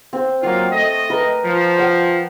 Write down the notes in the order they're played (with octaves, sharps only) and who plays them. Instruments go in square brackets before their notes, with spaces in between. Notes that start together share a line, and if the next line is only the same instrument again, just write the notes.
[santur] C4 C5
[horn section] F#3 A#3 F4 [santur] F#5 G5 D#6
[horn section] A3 D#5
[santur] A#4 B4
[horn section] F3
[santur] F#5 G5